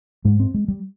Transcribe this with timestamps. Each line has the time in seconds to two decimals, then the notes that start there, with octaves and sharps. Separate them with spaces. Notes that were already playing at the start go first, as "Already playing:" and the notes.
0.25 G#2 G#3
0.40 C4
0.54 G#3
0.68 G3